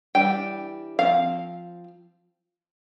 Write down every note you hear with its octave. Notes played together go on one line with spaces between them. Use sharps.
E3 G3 D4 G5
F3 C4 F5